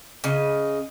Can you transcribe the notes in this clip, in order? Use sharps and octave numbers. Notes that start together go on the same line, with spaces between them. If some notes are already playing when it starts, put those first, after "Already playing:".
C#3 D#5